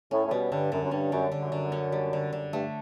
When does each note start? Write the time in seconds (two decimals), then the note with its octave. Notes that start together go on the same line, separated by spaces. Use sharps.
0.11 A2 C#4
0.26 A2
0.31 B2 G3
0.51 G2 D3
0.72 F#2 D3
0.83 F#2
0.91 G2 C#4
1.12 F#2 G3
1.32 D3
1.40 F#2
1.52 D3
1.72 C#4
1.92 G3
2.13 D3
2.33 D3
2.53 G2 A3